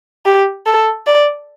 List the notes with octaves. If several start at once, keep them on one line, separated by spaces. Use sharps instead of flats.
G4
A4
D5